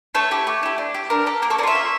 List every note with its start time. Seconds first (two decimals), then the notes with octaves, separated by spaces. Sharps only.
0.15 A3 A4 C#5
0.31 E4 G4
0.47 A3
0.63 E4 G4
0.78 D4
0.95 G4
1.10 D4 A#4
1.26 G4 A4
1.42 A#3 A#4
1.50 A4 C#5
1.58 C#4 A#4 D5
1.63 F4 C#5 E5
1.75 A#3